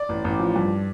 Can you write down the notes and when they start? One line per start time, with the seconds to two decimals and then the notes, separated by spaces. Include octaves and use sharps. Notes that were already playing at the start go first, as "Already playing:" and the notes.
Already playing: D5
0.09 A1
0.24 A1
0.39 F3
0.56 G2